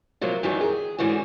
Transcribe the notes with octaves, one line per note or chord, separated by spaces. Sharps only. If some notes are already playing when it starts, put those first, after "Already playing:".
C3 F3 F#3 A#3
F#2 D#3 E3 F#3 G3
G#4
G#2 D3 E3 C#4 F#4